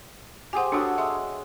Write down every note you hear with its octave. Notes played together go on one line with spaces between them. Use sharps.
G4 G#4 C5 F#5 G#5
D4 F#4 A4 C#5 F#5
G#3 E5